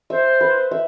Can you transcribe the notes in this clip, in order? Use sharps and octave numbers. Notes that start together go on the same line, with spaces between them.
C5 E5
B4
E5